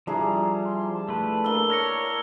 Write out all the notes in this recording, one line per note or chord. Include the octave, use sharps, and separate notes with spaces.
F3 G3 D4 E4 G#4 A#5
C6
A5
A3 B4
A#3 D4 A#4 A5 E6 G7
C#5 F6 A#6 C#7